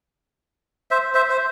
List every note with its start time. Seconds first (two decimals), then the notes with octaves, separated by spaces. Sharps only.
0.91 C5 E5
1.15 C5 E5
1.30 C5